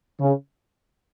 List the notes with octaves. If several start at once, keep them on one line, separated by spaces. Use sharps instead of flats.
C#3